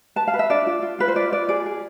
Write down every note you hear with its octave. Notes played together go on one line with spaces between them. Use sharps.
B4 A5
F5
B4
E5
D4 D5
F4
F4
F4 B4
C5
F4 D5
F4 D5
G#4 D5
G#4